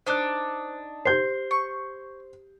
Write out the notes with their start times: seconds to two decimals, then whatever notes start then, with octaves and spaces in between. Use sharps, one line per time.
0.07 D4 D#4 C5 F#6
1.05 G4 C5 G6 C7
1.51 C#6